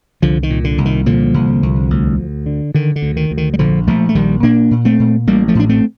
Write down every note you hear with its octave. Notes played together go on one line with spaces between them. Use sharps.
C2 D3 F3
D#3
A#2
D3
C2
D#3
A#2 D3 F3
C2
C2
D2
D2
D3
D3 D#3
D3
D2
D#3
D2
D#3
G3
A#1 D3 F3
A#1 F3 A3
A3
A#1 D#3 G3
A#2 A#3 D4
A#2
A3 C4
A#2
A1 G3 A#3
F3 A3
A2 D4
A3 C4